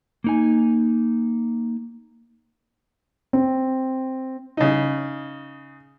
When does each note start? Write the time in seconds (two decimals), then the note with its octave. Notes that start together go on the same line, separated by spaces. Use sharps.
0.24 A#3 D#4 G#5
3.33 C4
4.57 C#3 D#4